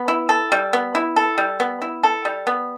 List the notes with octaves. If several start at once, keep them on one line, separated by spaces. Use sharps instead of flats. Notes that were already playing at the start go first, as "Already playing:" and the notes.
Already playing: B3
E4
A4
G3
B3
E4
A4
G3
B3
E4
A4
G3
B3